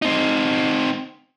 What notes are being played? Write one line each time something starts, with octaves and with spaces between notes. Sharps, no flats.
C4 D#4